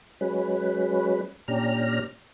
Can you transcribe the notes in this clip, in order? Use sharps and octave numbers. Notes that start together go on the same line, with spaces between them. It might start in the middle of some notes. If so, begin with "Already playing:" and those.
F#3 G#3 C#4 B4
A#2 C#4 D4 G4 A#5 F6